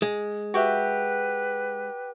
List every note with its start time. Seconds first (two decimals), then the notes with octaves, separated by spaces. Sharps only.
0.02 G#3
0.54 F#4 G4 B4 E5